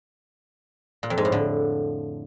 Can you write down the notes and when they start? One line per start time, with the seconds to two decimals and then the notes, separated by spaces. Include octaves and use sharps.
1.03 A#2
1.10 F2
1.18 G#2
1.25 A2
1.32 D3